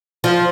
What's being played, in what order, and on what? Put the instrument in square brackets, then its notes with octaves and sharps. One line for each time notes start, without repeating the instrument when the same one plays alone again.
[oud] F3